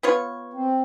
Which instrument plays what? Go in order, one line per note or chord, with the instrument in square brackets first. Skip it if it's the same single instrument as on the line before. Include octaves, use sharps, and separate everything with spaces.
[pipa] B3 F4 C#5
[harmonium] C4